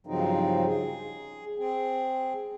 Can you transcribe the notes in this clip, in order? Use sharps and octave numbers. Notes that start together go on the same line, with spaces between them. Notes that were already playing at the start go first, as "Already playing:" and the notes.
G2 C#3 F3 F#3 C4 D#4
G#4
C4 G#4